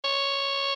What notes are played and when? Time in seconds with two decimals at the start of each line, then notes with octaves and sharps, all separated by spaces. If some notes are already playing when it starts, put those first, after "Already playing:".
0.04 C#5